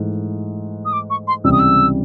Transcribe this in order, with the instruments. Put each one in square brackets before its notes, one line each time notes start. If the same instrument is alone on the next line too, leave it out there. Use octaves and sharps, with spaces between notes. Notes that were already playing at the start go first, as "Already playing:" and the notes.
Already playing: [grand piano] G#2 E3 A3
[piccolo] D#6
D6
C#6
C6
[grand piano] C#2 C3 E3 G3 [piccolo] E6
[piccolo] D#6
E6